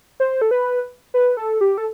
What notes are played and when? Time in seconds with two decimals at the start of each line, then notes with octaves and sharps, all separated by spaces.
0.20 C5
0.42 A4
0.51 B4
1.14 B4
1.37 A4
1.61 G4
1.78 A4